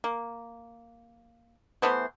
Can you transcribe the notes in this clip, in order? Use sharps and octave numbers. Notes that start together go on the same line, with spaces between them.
A#3
E3 A3 B3 C5